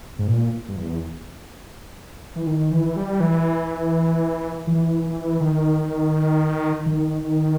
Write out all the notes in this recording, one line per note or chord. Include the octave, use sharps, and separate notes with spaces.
G#2
A#2
G2
E2
E3
D#3
E3
G3
E3
E3
E3
D#3
D#3
D#3